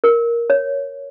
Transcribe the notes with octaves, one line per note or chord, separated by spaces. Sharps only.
A#4
C#5